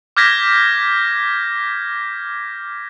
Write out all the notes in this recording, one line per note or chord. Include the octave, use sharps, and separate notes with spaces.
D6 F6 G6 G#6 A#6 B6